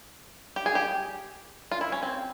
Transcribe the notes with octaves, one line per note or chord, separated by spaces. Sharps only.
G4
G#4
G4
F4
E4
C#4
C4